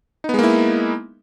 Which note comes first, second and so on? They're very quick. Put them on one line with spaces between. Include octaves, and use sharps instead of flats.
D#4 B3 G#3 A#3 E4